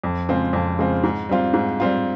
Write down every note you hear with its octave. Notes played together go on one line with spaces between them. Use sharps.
F2
C#3 G#3 C4 F4
F2
C#3 G#3 C4 F4
G#2
G3 C4 F4
G#2
G3 C4 F4